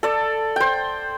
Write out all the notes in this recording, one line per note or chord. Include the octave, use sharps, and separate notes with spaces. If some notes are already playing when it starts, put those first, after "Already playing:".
A4 D5
C5 G5